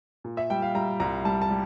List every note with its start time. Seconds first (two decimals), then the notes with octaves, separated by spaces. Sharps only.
0.24 A#2
0.37 E5
0.50 G3 G5
0.62 F5
0.75 G3 A#5
1.00 C2 A#5
1.25 G3 A5
1.42 A5
1.50 G3